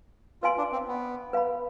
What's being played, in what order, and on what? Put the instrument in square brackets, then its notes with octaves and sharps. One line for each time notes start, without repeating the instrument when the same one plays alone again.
[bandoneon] F4 [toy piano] B4 F5 G#5 C6
[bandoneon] D4
C4
B3
[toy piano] B4 F5 B5